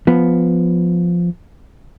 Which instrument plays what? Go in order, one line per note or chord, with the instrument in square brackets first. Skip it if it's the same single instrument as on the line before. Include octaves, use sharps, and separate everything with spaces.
[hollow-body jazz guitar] F3 B3